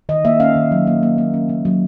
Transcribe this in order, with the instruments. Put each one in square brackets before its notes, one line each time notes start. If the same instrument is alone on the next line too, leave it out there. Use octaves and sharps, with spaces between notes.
[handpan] D#3 D#5
A#3 E5
C#4 F5
D#3
F#3
A#3
A#3
A#3
C#4
A#3
F#3